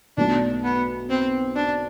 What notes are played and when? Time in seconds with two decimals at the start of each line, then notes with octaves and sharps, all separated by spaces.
0.17 B1 B2 A3 D4
0.64 B3
1.09 C4
1.56 D4